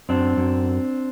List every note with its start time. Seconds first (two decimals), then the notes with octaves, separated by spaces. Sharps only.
0.09 F#2 C4 D4
0.37 F#2